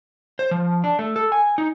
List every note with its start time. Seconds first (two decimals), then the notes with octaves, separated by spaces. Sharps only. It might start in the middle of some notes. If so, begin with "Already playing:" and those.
0.39 C5
0.51 F3
0.84 D4
0.99 A3
1.16 A4
1.32 G#5
1.58 D#4